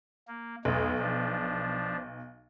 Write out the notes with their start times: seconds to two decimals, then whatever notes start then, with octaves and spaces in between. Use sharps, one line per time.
0.28 A#3
0.65 B1 E2 G#3
0.99 F3 D4